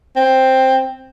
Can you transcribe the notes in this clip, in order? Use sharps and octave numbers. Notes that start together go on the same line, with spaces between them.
C4